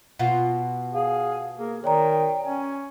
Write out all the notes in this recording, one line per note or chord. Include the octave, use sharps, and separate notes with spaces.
B2 F4 F#5
G#4 F5
A#3 G#4
D#3 C#5 D5 G5 A#5
C#4 G#5